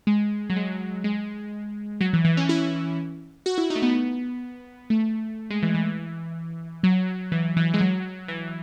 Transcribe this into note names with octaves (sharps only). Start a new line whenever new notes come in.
G#3
F#3
G#3
G#3
F#3
E3
E3
C#4
E4
F#4
E4
D#4
A3
B3
A3
G#3
E3
E3
F#3
E3
E3
G#3
F#3
E3